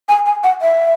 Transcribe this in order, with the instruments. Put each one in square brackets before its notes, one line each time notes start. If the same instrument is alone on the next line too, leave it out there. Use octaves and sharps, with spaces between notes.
[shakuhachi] G#5
G#5
F#5
E5